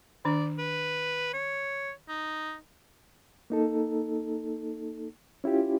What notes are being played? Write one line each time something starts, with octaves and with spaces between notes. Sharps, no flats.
D#3 D4 D5
B4
C#5
D#4
A#3 D#4 A4
C#4 E4 F4 G4